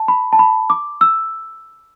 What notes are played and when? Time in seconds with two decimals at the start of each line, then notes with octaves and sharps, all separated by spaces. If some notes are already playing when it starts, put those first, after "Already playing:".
Already playing: A5
0.08 B5
0.33 A5
0.39 B5
0.70 D6
1.01 E6